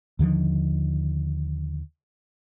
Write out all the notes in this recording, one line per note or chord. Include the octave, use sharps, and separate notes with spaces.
D#2 D3 D#3 F3